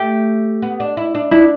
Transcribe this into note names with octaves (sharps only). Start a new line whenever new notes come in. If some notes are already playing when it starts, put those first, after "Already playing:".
Already playing: A3 G4
B3
D4
E4
D4
D4 E4